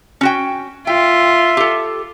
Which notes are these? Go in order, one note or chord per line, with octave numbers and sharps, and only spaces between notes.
C#4 F#4 G5
F4 E5 G5
G4 A4